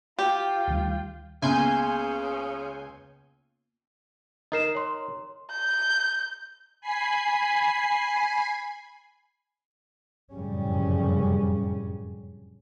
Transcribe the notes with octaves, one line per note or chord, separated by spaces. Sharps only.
F4 G4 G5
D2 D#3 G3
C#2 C#3 A#3 B3 E5 G#5 C6 G6
D#4 A#4 D#5 C7 E7
C#5 C6
G6
G#5 B5 C7
F1 F#2 A2 C#3 G3 C#4